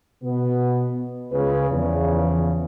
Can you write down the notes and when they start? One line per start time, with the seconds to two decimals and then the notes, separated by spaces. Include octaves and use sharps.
0.23 B2 B3
1.32 C#2 C#3 B4
1.70 E2 C#3 F3